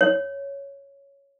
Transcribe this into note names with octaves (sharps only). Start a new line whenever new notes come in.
C#5